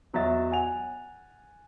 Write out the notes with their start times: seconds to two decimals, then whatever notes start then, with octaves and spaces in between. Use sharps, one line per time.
0.14 E2 F#3 D#5 E5 A6
0.51 F#5 G#5 F7